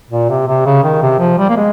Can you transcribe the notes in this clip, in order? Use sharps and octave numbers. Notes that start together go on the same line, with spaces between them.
A#2
C3
C3
C#3
D#3
C3
F3
G3
A#3
G#3